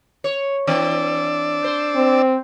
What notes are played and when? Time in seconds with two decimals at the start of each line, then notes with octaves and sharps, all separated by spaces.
0.24 C#5
0.67 E3 C4 D4 D5 E6
1.64 C5
1.96 C4